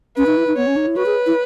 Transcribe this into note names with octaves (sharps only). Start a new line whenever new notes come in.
C#4 B4
D#4
E4
D#4
B3 C#5
C#4
D#4
E4
F#4 B4
G#4
E4